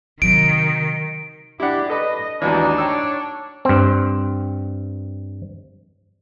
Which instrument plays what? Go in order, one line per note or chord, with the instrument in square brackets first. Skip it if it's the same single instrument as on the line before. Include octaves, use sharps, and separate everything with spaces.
[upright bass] C3 F#3 [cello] D#3 [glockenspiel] D7
[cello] D4 G4 [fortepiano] E4 F#5
[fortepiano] A4 B4 [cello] D#5
[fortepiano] G#1 D#2 E3 [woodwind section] D4 [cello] D#4 F#4
[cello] C#5 [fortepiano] G5 E6
[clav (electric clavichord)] G2 C4